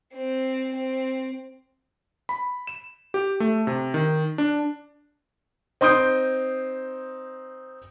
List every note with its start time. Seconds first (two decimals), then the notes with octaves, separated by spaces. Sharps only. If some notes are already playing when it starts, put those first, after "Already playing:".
0.15 C4
0.76 C4
2.29 B5
2.67 E7
3.14 G4
3.40 A3
3.67 C3
3.94 D#3
4.38 D4
5.81 C4 D#4 C6 D#6 G6 D7